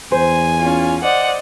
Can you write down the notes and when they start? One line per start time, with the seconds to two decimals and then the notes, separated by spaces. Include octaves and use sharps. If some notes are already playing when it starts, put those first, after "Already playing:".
0.12 E2 C5 G#5
0.59 C#4 F4
1.03 C5 D5 D#5 F#5